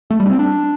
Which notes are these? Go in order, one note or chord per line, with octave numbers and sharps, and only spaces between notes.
A3
G3
D4
C4
D4